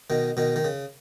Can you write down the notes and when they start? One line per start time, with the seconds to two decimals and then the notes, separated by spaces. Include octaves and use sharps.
0.10 B2 D#3
0.37 B2 D#3
0.56 D#3
0.64 C#3